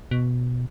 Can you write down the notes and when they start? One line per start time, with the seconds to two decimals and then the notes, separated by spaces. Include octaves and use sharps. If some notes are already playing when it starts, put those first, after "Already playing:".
0.11 B2